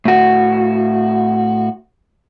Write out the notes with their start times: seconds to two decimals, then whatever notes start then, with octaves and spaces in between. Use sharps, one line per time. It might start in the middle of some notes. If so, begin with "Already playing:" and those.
0.05 A2 F#4